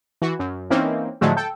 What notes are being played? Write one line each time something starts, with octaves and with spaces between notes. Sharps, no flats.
E3 F#4
F#2
E3 A#3 C4 C#4 D#4
A2 D3 F3 F#3 G#3 A3
A4 G5